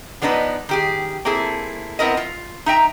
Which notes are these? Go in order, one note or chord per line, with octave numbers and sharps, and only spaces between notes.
F3 B3 D4 D#4 F#4 B4
D#3 G4 G#4
A#3 C4 E4 G#4 A4
B3 C4 E4 A#4 D#5
F4
D#4 E5 G5 A#5